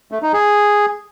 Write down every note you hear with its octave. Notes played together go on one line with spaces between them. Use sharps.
A3
D#4
G#4